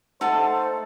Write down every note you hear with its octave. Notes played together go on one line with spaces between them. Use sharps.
A3 D#4 A4 C5 F#5 A5